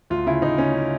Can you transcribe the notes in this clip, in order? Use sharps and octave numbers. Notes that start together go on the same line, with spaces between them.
D2 F4
C#3 E4
D2 D#4
C#3 C#4
C#3